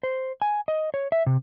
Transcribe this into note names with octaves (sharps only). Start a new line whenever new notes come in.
C5
G#5
D#5
C#5
E5
C3